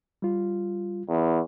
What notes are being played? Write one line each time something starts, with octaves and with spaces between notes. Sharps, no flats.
G3 F4
E2